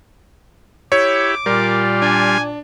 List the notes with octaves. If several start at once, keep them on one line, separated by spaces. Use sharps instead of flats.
E4 G4 C#5 D6
A#2 G3 F4 A#4 D5
D4 G#5